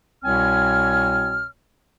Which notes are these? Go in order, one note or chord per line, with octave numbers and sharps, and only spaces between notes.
C2 B2 C4 C#5 G#5 F6